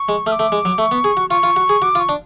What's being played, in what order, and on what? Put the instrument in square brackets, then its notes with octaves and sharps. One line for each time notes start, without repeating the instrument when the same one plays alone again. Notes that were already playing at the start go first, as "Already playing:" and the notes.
Already playing: [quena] C#6
[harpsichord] G#3
[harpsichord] A3 [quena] F6
[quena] D6
[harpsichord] A3
G#3
F#3
[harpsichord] A3 [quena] C#6
[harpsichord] B3
G#4
F#4
[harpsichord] F4 [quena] C#6
[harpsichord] F4
F#4
G#4
[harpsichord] F#4 [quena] D6
[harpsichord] F4
[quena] C#6
[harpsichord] D4